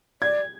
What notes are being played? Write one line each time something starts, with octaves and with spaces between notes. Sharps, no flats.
D5 G#6